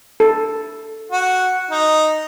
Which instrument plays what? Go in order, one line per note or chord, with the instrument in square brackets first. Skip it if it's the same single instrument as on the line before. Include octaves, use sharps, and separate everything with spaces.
[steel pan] A4
[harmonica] F#4
D#4